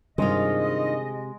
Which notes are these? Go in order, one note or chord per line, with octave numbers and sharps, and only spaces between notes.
G2 C3 D#3 G#3 F4 D#5